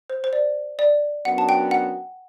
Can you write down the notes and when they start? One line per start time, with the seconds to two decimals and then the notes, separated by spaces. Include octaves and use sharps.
0.10 C5
0.24 C5
0.33 D5
0.79 D5
1.25 F#2 F#3 B3 D4 F#4 F#5
1.38 A5
1.49 G5
1.71 F#5